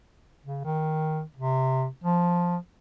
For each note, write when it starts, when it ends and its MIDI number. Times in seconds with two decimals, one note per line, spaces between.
0.44 0.64 49
0.64 1.22 51
1.36 1.86 48
2.04 2.57 53